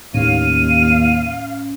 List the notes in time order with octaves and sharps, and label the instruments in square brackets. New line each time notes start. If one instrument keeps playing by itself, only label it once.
[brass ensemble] D#2 [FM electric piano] A2 C#4 [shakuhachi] F5 [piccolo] D#7